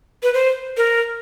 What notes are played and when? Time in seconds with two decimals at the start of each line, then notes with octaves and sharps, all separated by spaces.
0.23 B4
0.34 C5
0.77 A#4